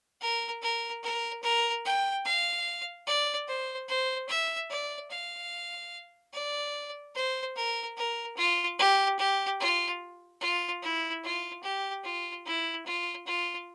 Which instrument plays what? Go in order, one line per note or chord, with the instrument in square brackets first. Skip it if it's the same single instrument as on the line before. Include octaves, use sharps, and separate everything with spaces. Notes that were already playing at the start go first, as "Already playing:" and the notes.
[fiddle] A#4
A#4
A#4
A#4
G5
F5
D5
C5
C5
E5
D5
F5
D5
C5
A#4
A#4
F4
G4
G4
F4
F4
E4
F4
G4
F4
E4
F4
F4